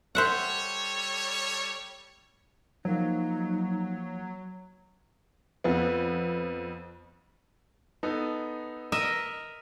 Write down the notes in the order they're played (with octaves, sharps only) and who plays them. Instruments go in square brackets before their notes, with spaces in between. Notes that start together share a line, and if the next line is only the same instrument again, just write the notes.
[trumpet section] G3 A4 C#5 [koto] C5 E5 F#5
[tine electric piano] F3 A#3 [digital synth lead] F#3 [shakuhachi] D#4
[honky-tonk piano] F2 B3
[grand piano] B3 D#4 A4
[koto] A#4 D#5 E5